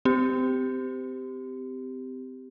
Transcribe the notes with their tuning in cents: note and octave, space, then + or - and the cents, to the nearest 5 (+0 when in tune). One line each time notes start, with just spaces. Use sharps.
C4 -30 G4 +0